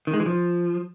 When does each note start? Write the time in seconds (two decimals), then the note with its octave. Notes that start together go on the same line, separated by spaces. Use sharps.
0.07 D#3
0.14 G#3
0.20 E3
0.26 F3